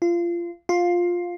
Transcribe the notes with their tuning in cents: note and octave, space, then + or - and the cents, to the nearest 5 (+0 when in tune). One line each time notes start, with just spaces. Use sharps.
F4 -25
F4 +10